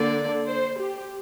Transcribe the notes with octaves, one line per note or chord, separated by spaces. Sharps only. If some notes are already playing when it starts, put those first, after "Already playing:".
Already playing: D3 A#3 D4 D5
C5
G4